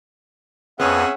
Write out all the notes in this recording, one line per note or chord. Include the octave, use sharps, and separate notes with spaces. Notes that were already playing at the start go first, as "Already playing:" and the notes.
F2 B3 C#4 G#4 E5 F#5